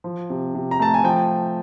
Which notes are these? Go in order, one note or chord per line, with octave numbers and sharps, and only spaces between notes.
F3
C3
C3
A#5
A3 A5
G#5
F3 G5